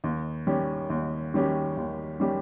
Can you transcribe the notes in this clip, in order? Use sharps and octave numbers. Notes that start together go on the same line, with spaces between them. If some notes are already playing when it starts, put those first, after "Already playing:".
D#2
D#3 G3 C#4 G4
D#2
D#3 G3 C#4 G4
D#2
D#3 G3 C#4 G4